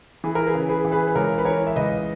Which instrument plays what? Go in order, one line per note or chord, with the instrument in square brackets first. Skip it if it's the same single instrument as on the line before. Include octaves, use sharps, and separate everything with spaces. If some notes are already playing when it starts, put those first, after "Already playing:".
[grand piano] E3 G#4
A#4
G#4 B4
C#3
G#4 B4
E3
G#4 B4
B4
C#2 A#4 C#5
B4
E3 A#4 C#5
E5
C#2 B4 D#5